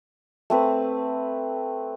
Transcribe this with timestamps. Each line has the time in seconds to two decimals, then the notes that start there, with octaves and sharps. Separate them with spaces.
0.50 A3 C4 B4